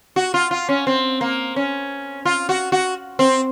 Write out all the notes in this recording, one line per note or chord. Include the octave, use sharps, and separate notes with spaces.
F#4
F4
F4
C#4
C4
A#3
C#4
F4
F#4
F#4
C4